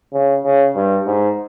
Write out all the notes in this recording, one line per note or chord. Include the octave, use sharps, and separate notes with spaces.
C#3
C#3
G2
G#2